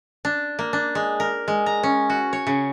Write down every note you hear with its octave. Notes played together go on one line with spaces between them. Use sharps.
D4
A#3
D4
G#3
A#4
G#3
A#5
C#4
F#4
C#5
C#3